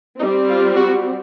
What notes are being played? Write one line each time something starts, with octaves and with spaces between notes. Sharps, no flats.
G3 C4 D#4
F4
F#4